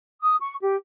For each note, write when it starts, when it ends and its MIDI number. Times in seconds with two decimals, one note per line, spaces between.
0.22 0.35 87
0.40 0.56 85
0.62 0.76 67